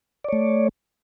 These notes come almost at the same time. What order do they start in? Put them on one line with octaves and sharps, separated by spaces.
D5 C#5 A3